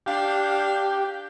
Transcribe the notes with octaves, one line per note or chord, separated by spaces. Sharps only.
D4 G4 F5